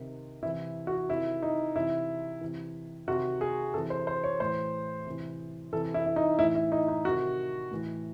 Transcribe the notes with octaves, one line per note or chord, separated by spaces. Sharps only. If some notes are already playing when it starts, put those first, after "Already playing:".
Already playing: C3 D#3
C3 E3 E4
F#4
C3 D#3 E4
D#4
C3 E3 E4
C3 E3
C3 D#3 F#4
G#4
C3 E3 A4
C5
C5
C#5
A2 E3 C5
C3 E3
C3 E3 A4
E4
E4
D#4
A2 E3 E4
E4
D#4
D#4
C3 D#3 F#4
A2 E3